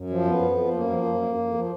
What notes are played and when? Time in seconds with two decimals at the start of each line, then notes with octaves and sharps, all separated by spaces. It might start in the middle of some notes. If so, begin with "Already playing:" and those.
Already playing: F#2
0.10 F3
0.26 F2 B3
0.42 F2
0.58 F3
0.73 F#2 A#3
0.90 F3
1.05 F#2
1.22 F2
1.38 F2
1.54 F3